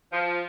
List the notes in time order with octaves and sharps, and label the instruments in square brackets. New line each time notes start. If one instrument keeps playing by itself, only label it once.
[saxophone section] F3